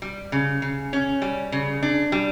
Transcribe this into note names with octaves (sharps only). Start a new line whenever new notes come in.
G3
C#3
C#3
C#4
G3
C#3
D4
G3